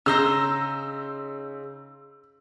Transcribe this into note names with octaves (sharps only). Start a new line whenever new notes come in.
C#3 D#4 C5 A#5 E6